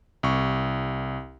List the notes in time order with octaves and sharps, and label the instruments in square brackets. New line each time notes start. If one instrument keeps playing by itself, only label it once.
[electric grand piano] C2 C#6